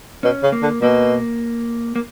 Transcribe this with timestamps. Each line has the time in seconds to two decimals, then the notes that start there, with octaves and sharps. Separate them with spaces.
0.23 B2 C#4
0.43 C#3
0.52 A#3
0.62 D3
0.82 B2 A#3
1.96 A#3